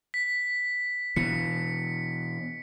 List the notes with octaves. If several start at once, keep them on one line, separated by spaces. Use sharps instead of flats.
B6
B2 E3 C#7